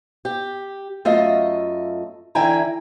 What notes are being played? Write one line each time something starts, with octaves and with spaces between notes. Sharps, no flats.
G4
F#2 A3 F4 D#5 E5
D3 E3 E4 G5 G#5 A#5